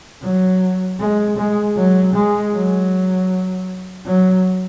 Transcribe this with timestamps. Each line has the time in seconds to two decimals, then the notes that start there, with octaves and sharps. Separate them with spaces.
0.22 F#3
0.99 G#3
1.37 G#3
1.76 F#3
2.14 G#3
2.53 F#3
4.06 F#3